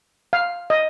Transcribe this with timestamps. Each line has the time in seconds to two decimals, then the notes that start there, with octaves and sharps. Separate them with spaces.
0.33 F5
0.70 D#5